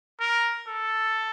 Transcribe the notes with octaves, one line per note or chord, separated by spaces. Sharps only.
A#4
A4